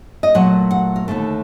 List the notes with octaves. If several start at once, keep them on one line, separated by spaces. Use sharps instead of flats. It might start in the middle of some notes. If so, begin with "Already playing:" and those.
D#5
A#2 F#3 A3 F#5
F#5
A#4
D#2 D3 A3 A4